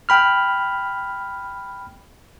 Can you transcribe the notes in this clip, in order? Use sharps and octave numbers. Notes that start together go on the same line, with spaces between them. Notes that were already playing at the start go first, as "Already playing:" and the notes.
G5 B5 F6